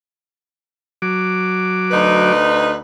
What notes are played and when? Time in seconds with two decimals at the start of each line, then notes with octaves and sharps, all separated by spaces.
1.02 F#3 D6
1.91 D2 D#4 B4